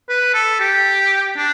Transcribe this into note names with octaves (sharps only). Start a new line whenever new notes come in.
B4
A4
G4
D4